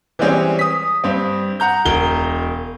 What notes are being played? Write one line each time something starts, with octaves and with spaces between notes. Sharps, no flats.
E3 G3 G#3 C4 C#4
D#6 B6
G2 C4
F#5 A#5 G6
E1 A#4 G7